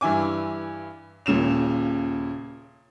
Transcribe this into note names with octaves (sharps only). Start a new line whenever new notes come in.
G2 E3 E4 G#5 D6
D#1 A#2 C#3 E7 F7